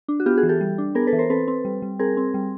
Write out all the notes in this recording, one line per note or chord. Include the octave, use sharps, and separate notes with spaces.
D4
F#4
B3 F4 G4
F#4 G#4
E3
G4 A4
G3
D4
B3 G#4 A#4
A4 B4
E3
A#4 C5
C4 A4 B4
C4
G3
G3
C4 G#4 A#4
C4
G3